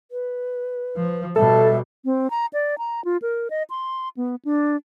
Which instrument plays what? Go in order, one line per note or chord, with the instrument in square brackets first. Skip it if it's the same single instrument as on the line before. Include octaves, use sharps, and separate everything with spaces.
[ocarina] B4
[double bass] F3
[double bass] B2 G3 [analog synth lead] A4 [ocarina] E5
[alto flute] C4
A#5
D5
A#5
F4
A#4
D#5
C6
B3
D4